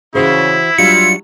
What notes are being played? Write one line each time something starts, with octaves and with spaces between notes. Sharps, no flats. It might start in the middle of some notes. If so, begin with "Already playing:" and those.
C#3 E3 E4 F#4 C5
F#3 G3 D4 F4 C#7